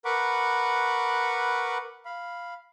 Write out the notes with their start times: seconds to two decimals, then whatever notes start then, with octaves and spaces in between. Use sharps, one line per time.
0.05 A#4 B4 F#5 B5 C#6 D6
2.05 F5 B5